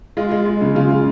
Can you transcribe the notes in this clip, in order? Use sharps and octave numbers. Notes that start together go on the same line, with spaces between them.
G#3 F4
G#3
G#3
C#3
C#3 F4
C#3